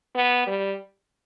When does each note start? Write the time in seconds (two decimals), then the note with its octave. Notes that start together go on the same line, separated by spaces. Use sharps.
0.15 B3
0.47 G3